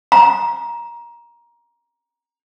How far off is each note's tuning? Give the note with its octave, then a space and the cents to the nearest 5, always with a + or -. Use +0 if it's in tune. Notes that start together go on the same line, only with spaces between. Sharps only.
A#5 +20